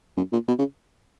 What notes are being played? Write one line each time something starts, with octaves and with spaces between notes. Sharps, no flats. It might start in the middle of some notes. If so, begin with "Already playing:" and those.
F#2
A#2
B2
C#3